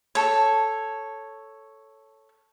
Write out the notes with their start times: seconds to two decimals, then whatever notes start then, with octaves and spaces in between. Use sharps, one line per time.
0.15 A4 C#5